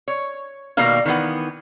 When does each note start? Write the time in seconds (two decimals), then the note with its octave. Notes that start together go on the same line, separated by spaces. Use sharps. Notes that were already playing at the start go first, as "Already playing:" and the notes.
0.08 C#5
0.77 B2 D#3 G3 A#3 A#4 F5
1.06 D#3 E3 B3